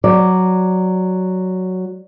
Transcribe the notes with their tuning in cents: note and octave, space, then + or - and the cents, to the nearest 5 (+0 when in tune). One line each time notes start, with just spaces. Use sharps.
F#3 +0 D5 +0